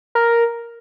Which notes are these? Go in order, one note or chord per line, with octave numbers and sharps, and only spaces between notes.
A#4